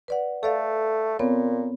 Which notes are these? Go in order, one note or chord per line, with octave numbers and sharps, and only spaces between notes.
B4 D5 F#5
A3 A4 D5 F5
A#2 B3 C4 C#5